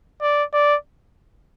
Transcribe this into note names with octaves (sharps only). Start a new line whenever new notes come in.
D5
D5